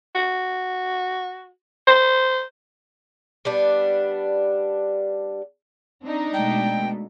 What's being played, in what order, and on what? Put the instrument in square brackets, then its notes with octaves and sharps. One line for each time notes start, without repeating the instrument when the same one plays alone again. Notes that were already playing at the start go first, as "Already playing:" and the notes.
[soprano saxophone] F#4
C5
[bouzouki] G3 B3 D4
[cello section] C4 [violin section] D4 D#4
[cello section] B2 G#3 A3 [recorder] G5